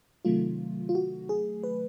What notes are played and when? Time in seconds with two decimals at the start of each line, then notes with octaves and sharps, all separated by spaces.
0.25 C3 D#3 F#3 A3 F4
0.89 F4
0.95 F#4
1.29 G#4
1.63 B4